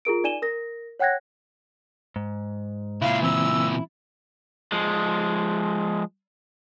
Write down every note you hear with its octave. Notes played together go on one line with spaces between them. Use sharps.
F4 G#4 A#4 D7
D#4 D5 G#5 D#7 E7 G7
A#4 A#6
C#5 F#5 G5 F#6 G#6 A#6
G#2
C#2 A#2 E4 F5
E3 C4 E6
F3 G#3